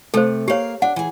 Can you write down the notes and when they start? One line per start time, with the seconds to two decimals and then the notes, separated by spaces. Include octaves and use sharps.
0.14 C3 A3 A4 C5
0.48 A#3 G4 C#5 F5
0.82 D4 F#5
0.96 E3 G#4